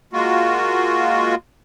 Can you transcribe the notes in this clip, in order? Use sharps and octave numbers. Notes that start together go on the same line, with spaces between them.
G#3 A#3 F4 F#4